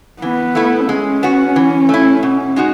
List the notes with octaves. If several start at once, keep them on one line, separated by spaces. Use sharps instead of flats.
E3 B3
A3 E4 A4
G#3 C#4
B3 F#4
E3
A3 E4
B2
G#3 D#4 F#4